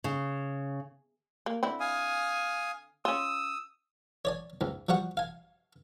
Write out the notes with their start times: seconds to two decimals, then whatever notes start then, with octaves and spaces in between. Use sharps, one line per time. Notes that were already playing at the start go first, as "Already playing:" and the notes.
0.04 C#3
1.46 A#3
1.63 D3 C4 E4
1.80 F5 G#5 D#6
3.05 C#4 F4 D#6 E6
4.25 C#5 D5 G#5
4.61 C#2 G#2
4.89 F3 G3 F#4 F#5 C#6
5.17 F5 G#5